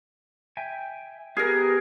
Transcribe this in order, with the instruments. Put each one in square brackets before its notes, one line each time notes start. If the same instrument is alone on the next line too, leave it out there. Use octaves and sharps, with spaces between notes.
[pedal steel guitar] E5 G5 G#5
[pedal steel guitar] B3 G4 F6 [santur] G#4 A#4